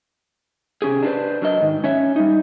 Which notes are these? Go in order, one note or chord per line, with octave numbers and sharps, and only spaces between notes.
C3 F3 C#4 G4 G#4
D4 E4 F4 B4 C5
F#3 D4 A#4 D#5
G#2 D#3
C#4 C#5 E5
G3 D#4